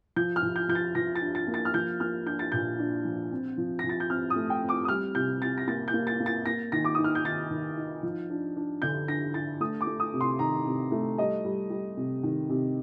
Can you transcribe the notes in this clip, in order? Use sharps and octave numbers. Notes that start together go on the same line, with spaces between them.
F3 G6
F6
F3
G6
F3 G6
A6
F3 A#6
A6
D4
A6
A#3
A6
F6
F3 G6
A#3 F6
D4 G6
A6
A#2 G6
D4
F3
C4
F3
F3 A#6
A6
G6
C4 F6
D#6
A3
G5
C4
D6
D#6
G3 F6
C3 G6
C3 A6
A#6
A#3 A6
G6
A#3
A6
A#3
A6
A#3 A#6
D#3 A#6
D6
D#4 D#6
F6
G6
D#3 A6
D#3
D#4
F3
D4
D4
D3 G6
D4 A#6
D4 A6
A3 D#6
D6
A3
D#6
C3
C6
D#3 A#5
C3
A3
G3 D#5
G3
G3
C3
D#3
C3